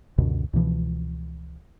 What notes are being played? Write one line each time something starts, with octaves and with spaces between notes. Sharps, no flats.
C#2 F#2 B2 D3
C#2 B2 E3 F3